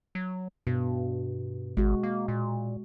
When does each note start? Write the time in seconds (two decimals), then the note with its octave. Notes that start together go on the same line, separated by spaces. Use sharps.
0.15 F#3
0.67 G2 B2
1.77 G#1 G#3 F#4
2.03 A#3
2.28 A#2